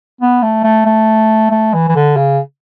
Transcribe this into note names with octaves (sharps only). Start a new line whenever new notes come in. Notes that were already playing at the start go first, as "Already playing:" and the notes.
B3
A3
A3
A3
A3
E3
E3
D3
C#3